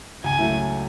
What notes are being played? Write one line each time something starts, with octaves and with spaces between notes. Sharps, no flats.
C#2 G#5
F#3 A3 E4